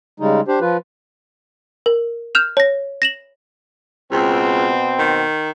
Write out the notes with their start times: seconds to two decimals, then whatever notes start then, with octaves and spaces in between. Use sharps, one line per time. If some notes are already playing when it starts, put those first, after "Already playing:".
0.20 C#3 G3 G#3 D#4
0.48 D4 G4 C5
0.61 F3 F4 B4
1.86 A#4
2.35 F6 G6 E7 F7
2.57 C#5 A#6
3.02 A#6 E7 F#7
4.12 C#2 B2 C4
4.99 D#3